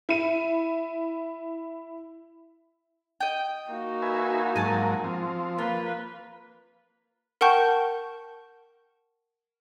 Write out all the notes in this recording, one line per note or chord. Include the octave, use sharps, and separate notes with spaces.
E4 D#7
D#5 G5
A#3 D#4 F#4
B4 E5 G#5
G#2 F#3 A#4 G#5 A5
F3 C4
A#3 F4 B4
A#4 F#5 G5 A5 C#6 G6